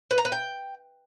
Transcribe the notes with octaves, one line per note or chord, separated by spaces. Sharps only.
B4
A#5
B4
G5